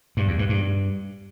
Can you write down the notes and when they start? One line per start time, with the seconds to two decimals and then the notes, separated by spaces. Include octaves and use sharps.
0.17 G2
0.28 E2
0.39 G2
0.49 G2